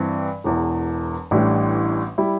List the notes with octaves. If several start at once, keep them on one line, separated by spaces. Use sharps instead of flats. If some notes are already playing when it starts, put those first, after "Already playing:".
Already playing: G2 E3 C4
E1 E2 E3
A1 A2 E3 G3 D4
G3 E4